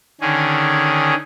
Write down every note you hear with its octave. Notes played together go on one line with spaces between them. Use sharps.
D3 D#3 C#4 G#4